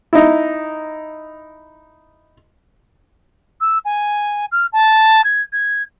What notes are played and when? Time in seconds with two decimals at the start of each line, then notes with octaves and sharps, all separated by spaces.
0.13 D#4 E4
3.61 E6
3.85 G#5
4.52 F6
4.73 A5
5.24 G#6
5.53 G#6